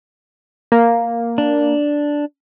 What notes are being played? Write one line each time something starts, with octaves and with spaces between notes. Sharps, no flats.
A#3
D4